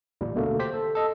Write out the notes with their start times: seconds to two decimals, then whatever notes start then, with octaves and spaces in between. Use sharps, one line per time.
0.21 A1 D2 A#2 G3
0.35 B2 D3 A3 A#3
0.59 G4 C5 B6
0.74 A4
0.95 A4 D#5